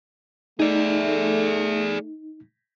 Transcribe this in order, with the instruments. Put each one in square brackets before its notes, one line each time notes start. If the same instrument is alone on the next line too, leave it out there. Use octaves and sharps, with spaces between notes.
[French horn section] A3 [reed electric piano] D#4 [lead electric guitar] G#4 D5